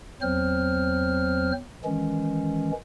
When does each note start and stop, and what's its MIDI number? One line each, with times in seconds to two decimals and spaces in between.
0.22 1.52 40
0.22 1.52 54
0.22 1.52 60
0.22 1.52 72
0.22 1.52 89
1.85 2.71 51
1.85 2.71 52
1.85 2.71 56
1.85 2.71 61